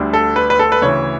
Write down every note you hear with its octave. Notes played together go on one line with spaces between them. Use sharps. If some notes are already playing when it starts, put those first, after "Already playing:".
Already playing: D2 D3 G3
A4
B4
B4
A4
B4
D2 C#3 E3 C#5